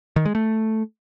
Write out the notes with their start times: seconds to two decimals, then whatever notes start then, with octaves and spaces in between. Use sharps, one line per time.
0.16 D#3
0.26 G#3
0.35 A3